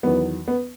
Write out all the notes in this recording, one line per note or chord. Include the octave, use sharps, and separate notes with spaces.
E2 D#3 F#3 B3
B3